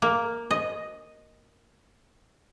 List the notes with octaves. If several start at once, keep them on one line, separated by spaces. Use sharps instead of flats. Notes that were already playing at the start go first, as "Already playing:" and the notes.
A#3
D#5